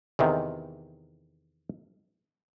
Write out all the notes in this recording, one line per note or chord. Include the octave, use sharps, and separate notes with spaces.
E2 C3 D#3